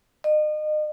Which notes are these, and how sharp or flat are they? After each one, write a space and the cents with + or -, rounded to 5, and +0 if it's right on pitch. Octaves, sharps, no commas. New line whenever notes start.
D#5 -35